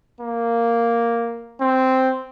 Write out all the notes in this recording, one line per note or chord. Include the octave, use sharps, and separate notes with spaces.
A#3
C4